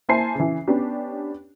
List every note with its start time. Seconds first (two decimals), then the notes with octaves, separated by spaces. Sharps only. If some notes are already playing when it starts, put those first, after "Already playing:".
0.09 A#3 E4 C5 G#5 A5 C7
0.35 C#3 E3
0.68 B3 C#4 D4 G4